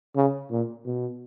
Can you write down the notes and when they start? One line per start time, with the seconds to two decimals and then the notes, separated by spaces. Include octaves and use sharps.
0.16 C#3
0.51 A#2
0.85 B2